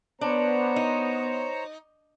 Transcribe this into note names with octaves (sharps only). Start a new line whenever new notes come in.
B3 D4 C5 C#5 A#5
D#4